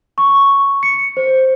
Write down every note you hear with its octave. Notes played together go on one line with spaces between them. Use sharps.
C#6
C#7
C5